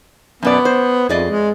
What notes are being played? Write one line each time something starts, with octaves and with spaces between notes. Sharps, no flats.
F#2 B2 B3 D5
C5
F2 G#4 D5 D#5
G#3